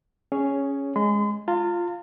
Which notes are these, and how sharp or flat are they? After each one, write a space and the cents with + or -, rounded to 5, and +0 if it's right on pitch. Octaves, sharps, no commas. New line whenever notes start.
C#4 +0 G#4 +0 C#5 +10
G#3 +0 C6 -40
F4 +0 A#5 -45